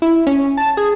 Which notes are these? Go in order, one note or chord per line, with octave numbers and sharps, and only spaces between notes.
E4
C#4
A5
G#4